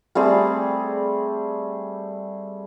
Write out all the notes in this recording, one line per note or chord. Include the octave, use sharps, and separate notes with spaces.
G3 A3 C4 G#4